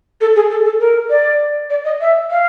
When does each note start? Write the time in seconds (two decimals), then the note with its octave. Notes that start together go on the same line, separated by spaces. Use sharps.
0.21 A4
0.36 G#4
0.50 A4
0.65 A4
0.80 A#4
1.10 D5
1.70 D5
1.85 D#5
2.01 E5
2.31 F5